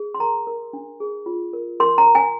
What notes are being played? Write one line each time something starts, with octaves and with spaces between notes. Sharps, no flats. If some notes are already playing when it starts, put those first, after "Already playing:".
Already playing: G#4
C6
A#4 A#5
A#4
D4
G#4
F4
A#4
A#4 C6
A#5
A#4
G#5